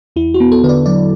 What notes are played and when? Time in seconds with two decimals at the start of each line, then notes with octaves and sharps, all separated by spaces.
0.16 E2 E4
0.34 F#4
0.40 B3
0.52 A4
0.64 D3 B4
0.69 D5
0.86 F#3 D5